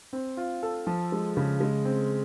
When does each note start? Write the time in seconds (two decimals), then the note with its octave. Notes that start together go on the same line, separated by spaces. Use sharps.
0.13 C4
0.37 F4
0.63 A4
0.87 F3
1.12 G#3
1.37 C#3
1.61 G#3
1.85 C4